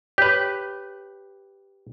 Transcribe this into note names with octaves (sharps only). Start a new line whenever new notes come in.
G4 B4 C#5